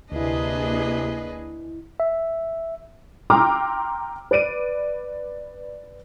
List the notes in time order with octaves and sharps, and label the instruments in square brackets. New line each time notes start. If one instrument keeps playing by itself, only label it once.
[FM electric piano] D2 E4 [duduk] C3 [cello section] A#3 D4 G#4 [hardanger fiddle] B4 D#5
[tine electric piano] E5
[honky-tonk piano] G5 A#5 C6 D6 E6 F6
B4 D5 D7 D#7